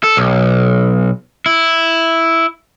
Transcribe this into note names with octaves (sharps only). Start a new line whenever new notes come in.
A4
B1
E4